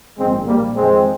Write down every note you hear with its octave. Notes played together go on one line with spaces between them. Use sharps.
A#1 G#2 D#3 G#3 C4
A#1 A#2 G3 A#3
F2 D#3 G#3 C4